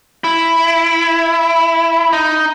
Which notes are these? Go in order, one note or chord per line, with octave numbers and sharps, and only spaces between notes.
E4
D#4